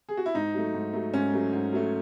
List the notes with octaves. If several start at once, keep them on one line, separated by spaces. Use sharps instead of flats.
G#4
F#4
E4
G#2 D#4
F#3 A3
G#2
F#3 A3
G#2 C#4
F#3 A3
G#2
F#3 A3